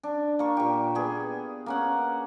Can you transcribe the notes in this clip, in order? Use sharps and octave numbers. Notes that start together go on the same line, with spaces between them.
D4
A#3 C#6
A#2 G4
B3 G#4
A#3 C#4 F#5